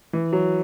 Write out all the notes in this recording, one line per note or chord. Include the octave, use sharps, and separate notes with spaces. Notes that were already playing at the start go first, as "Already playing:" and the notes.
E3
F#3